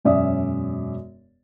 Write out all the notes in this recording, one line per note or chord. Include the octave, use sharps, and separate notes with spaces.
E1 F#2 C#4 D5 E5 D#6